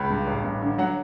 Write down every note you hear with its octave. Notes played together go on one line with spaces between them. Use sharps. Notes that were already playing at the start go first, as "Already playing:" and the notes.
Already playing: C#2 B5
G2
A1
G2
D3
F#3 F#5